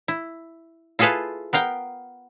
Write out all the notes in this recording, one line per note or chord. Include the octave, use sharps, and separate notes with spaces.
E4
E4 F4 G#4 A4 B4 F5
B3 A#4 F5 G5